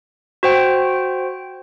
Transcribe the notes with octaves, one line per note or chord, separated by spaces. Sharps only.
F#4 C5 G5